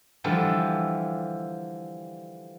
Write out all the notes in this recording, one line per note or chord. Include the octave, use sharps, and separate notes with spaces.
D3 E3 F3 G3